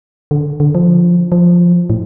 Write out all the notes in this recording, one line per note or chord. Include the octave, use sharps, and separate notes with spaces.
D3
D3
F3
F3
A2